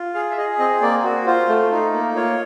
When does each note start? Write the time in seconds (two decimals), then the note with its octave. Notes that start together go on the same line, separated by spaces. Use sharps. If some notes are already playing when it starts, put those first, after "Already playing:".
Already playing: F4
0.14 G#4 F5
0.31 E5
0.37 G#4 D#5
0.59 C4 D#5
0.82 A#3 D5
1.04 F#4
1.26 F4 C5
1.48 A3
1.72 D#4
1.93 A#3
2.16 F4 C#5